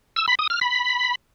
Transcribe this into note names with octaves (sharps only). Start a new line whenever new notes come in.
E6
B5
D#6
F6
B5